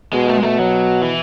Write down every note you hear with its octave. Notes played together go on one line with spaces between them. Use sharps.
B2 G#3
A3
G#3
B2 A3
F#3
E3